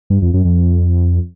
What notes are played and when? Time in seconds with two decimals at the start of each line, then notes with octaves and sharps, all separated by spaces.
0.10 G2
0.22 F2
0.34 F#2
0.45 F2